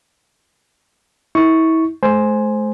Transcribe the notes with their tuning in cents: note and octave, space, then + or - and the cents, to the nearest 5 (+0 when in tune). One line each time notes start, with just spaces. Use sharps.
E4 -35 C#6 +0
A3 -45 C5 +0 G#5 +0